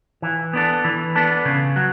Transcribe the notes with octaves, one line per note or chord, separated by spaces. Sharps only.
E3
B3 D4 A4
E3
B3 D4 A4
C#3
F#3